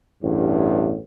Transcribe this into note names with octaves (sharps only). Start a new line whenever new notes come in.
A1 E2 G2